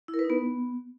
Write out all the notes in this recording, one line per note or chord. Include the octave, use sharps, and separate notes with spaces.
E4
A#4
B4
D#4
B3